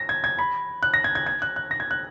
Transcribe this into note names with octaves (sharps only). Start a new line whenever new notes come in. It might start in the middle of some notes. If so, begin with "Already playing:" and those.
Already playing: A#6
G#6
G#6
B5
F#6
A#6
G#6
G#6
G#6
F#6
F#6
A#6
G#6
F#6